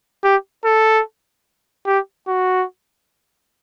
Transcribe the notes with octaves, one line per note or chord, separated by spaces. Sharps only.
G4
A4
G4
F#4